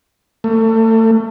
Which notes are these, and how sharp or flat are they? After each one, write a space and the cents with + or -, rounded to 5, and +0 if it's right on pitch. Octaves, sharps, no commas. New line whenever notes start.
A3 +30